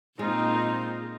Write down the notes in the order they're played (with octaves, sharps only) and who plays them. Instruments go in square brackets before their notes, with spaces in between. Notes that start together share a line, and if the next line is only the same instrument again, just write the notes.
[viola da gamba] A#2 [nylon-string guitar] G#3 [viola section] C4 D#4 F4